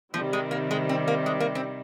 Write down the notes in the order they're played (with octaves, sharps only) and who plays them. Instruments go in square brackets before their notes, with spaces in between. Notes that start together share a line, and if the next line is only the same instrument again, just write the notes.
[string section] C3 D#3 G3 [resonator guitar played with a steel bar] F3
[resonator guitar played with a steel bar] G#3
A#3
G#3
C4
A#3
G#3
A#3
C4